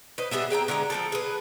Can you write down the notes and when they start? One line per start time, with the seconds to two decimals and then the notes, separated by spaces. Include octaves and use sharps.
0.18 B4 C5 D#5
0.31 G3 B3 G#4 E5
0.50 G#4 G5 G#5 A#5
0.68 D3 G#3 G#5 A#5
0.90 F3 C4 A4
1.12 G#4 B4